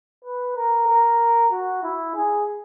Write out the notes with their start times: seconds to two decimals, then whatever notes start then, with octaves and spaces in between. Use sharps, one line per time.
0.24 B4
0.56 A#4
0.88 A#4
1.52 F#4
1.83 E4
2.15 G#4